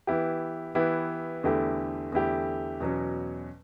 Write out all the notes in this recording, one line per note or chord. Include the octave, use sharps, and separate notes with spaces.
E3 B3 E4 G4
E3 B3 E4 G4
E2 D3 A3 E4 G4
E2 D3 A3 E4 G4
E2 B2 F#3 C#4